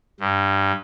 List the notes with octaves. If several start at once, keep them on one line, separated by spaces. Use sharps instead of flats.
G2